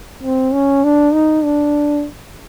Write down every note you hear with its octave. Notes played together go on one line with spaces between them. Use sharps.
C4
C#4
D4
D#4
D4